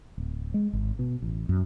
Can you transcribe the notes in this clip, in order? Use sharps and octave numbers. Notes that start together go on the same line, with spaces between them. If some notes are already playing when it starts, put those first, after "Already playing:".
D1
G#3
G#1
B2
A1
F#2